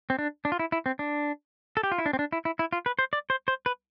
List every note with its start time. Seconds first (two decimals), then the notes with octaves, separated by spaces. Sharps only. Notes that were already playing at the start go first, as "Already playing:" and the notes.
0.10 C4
0.19 D4
0.45 D4
0.52 F4
0.59 E4
0.72 E4
0.86 C4
0.99 D4
1.77 A4
1.83 G4
1.92 F4
1.98 E4
2.06 D4
2.13 C4
2.19 D4
2.32 E4
2.45 E4
2.59 E4
2.73 F4
2.86 B4
2.99 C5
3.13 D5
3.30 C5
3.48 C5
3.66 B4